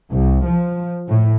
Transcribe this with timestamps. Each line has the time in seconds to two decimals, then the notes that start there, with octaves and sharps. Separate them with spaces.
0.11 C2
0.46 F3
1.08 A2